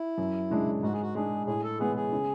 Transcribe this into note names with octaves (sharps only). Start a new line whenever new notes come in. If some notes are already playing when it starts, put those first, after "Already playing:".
Already playing: E4
F#2
C#3 G#3 D4
G#2 F#4
G#4
F#4
G#3 D4 G#4
A2 G#4
A4
E3 G#3 B3 G#4
G#4
C#3